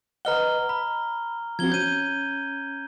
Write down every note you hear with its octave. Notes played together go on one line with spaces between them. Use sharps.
B4 D#5 F#5 A#5 F6 G7
A#5 B5
F3 C4 F#4 G#6 G7
C#4 G6 D#7